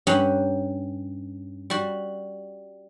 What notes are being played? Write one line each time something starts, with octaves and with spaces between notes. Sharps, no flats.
G2 C#4 G4 F#5 A#5
G3 F#4